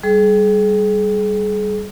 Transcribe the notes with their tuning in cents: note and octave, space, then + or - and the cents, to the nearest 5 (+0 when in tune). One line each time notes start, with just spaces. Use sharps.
G3 +0 G#4 +35